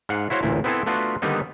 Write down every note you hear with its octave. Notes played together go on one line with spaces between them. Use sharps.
G#2 F5 F#5
E4 F#4 C5 C#5 F5
A1 D2 A#2 E4
B3 C4 E4 A4 C5 G#5
A3 B3 D4 F4 F#4
D3 D#3 G3 A#3 B3 D#4